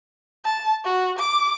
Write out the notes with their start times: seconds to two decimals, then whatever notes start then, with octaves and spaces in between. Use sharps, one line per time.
0.45 A5
0.84 F#4
1.19 D6